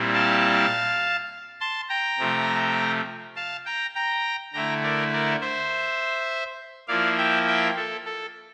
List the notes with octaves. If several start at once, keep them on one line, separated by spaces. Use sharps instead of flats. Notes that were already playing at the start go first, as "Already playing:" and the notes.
Already playing: A#2 G3 C4 E4
F5 A5
A5 C6
G5 A#5
C3 F3 A3
F5 A5
G5 A#5
G5 A#5
D3 A3 E4 G5 A#5
A#4 D5
A#4 D5
C5 E5
F3 A#3 E4 D5 F5
E5 G5
E5 G5
A4
A4